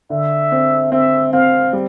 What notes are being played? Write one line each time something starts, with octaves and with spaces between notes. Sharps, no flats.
D3 E5
C4
C4 E5
C4 F5
G3